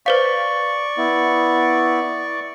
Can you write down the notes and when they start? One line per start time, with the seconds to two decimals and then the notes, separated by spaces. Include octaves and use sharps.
0.06 B4 C5 D5 F5 C#6
0.98 B3 E4